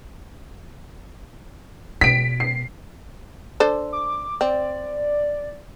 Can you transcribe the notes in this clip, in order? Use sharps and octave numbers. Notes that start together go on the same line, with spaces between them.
B2 B6 D7
C7
D4 A4 C5
D6
C4 D5